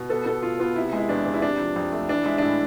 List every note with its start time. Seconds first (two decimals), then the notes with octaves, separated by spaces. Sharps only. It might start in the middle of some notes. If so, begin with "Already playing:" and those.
Already playing: B2
0.09 B3 A4
0.26 B2 A4
0.43 B2 F4
0.59 B3 F4
0.76 C3 E4
0.93 G#3
0.99 E4
1.09 E2 D4
1.26 E2
1.34 E4
1.42 C3 D4
1.59 F3
1.76 F2
1.92 A3
2.09 E3 D4
2.26 G#3 E4
2.38 D4
2.42 A2 E4